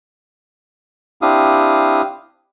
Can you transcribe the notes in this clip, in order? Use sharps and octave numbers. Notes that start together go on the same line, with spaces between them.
C4 D4 E4 G4 F5 D#6